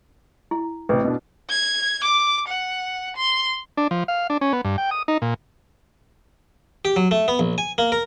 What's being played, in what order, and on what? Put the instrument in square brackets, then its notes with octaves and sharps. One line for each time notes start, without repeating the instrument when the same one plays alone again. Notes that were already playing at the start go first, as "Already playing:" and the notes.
[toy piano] E4
[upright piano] A1 C3 [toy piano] B4
[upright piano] B2 D4
[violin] G#6
D6
F#5
C6
[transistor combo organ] D4
F3
F5
D4
C#4
B3
G2
G5
D#6
D#4
A#2
[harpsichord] G4
F#3
A3
B3
A#1
G#5
A#3
A#4